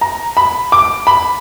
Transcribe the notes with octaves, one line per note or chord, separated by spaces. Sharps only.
A#5
B5
D6
B5